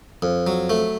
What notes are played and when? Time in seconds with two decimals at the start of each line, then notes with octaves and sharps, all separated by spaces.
0.22 F2
0.47 F#3
0.70 A3